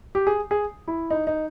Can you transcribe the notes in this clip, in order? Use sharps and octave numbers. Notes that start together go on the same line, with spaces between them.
G4
G#4
G#4
E4
D#4
D#4